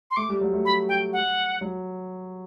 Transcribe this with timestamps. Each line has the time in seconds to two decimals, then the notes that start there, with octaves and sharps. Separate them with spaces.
0.11 C6
0.16 A3 D6
0.29 G3
0.41 F#3
0.53 A3
0.65 B5
0.89 G5
1.13 F#5
1.61 F#3